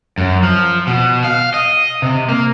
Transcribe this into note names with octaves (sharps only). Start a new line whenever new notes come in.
F#2
F3
B2
F5
D#5
C3
A#3